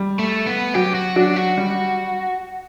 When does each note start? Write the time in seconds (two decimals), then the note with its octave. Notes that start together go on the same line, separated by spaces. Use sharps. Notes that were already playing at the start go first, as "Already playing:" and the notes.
Already playing: G3
0.19 A3
0.46 B3
0.74 F#3 G4
0.95 F#4
1.16 F#3 D4
1.36 F#4
1.58 G3